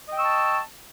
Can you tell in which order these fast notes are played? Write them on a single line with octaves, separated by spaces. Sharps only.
D#5 G5 E6 C#6 A5